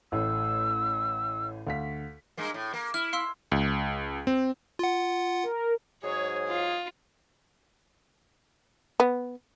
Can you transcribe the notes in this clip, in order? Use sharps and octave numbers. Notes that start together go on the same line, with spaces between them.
A1 A2 E6
D2 F5 B6
G2 G#3 A#3
A2
A#3
E4 F6
F5 C6 E6
C#2
C4
F4 F#5
A#4
G#2 F#3 G#4 C#5
F4
B3